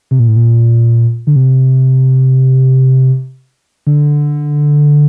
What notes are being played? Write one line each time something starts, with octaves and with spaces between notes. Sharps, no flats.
C3
A#2
A2
A#2
D3
C3
D3